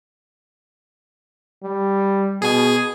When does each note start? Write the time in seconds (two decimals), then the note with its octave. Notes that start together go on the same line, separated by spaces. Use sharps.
1.63 G3
2.42 B2 G#4 G#5